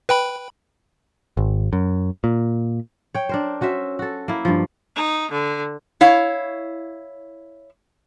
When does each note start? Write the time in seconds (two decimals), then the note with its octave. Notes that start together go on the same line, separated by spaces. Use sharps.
0.09 B4 G5 B5
1.37 G#1
1.73 F#2
2.24 A#2
3.14 C#5 G5
3.29 D4 A#4 C5
3.61 C#4 F#4 C5 E5
3.99 F#4 A4
4.28 A#3 E4
4.45 G2 F3
4.96 D#4
5.31 D3
6.01 E4 C#5 F5